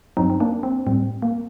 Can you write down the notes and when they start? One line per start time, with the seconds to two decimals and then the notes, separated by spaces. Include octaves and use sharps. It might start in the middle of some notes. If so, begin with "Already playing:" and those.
0.17 G2 F#3 C4 D#4
0.30 C4
0.40 A#3 D4
0.63 C4
0.87 A2 G3 C4
1.22 A#3